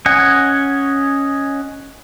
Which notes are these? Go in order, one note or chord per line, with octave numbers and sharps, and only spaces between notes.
C#4 D#5 F#5 G#5